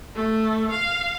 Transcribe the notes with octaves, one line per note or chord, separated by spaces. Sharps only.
A3
F5